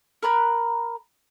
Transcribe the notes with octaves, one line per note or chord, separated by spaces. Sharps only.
A#4 A#5 B5 F#6